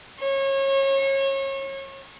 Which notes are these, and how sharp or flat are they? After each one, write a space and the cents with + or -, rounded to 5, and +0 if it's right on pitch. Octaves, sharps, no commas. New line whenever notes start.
C#5 -30